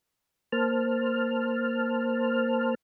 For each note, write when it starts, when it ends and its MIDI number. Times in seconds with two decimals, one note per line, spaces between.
0.52 2.75 58
0.52 2.75 72
0.52 2.75 81
0.52 2.75 89